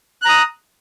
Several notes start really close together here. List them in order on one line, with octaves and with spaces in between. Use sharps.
F#6 A#5 D#6